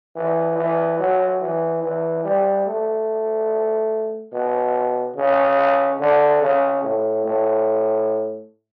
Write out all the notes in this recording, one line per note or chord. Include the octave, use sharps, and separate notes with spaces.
E3
E3
F#3
E3
E3
G3
A3
B2
C#3
D3
C#3
A2
A2